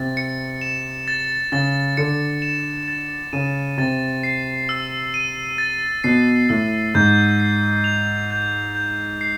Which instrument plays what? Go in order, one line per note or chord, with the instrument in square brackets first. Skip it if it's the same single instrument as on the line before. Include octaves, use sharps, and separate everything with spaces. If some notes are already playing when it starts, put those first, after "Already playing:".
Already playing: [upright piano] C3 [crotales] A6
[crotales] C#7
E7
A6
[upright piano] C#3 [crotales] A6
[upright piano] D3 [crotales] C#7
[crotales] E7
A6
[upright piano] C#3 [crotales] D#7
[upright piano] C3 [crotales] A6
[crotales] C7
E6
D#7
A6
[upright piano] B2 [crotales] C7
[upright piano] A2 [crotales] E6
[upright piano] G#2 [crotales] G6
[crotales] C7
F7
G6
G6
C7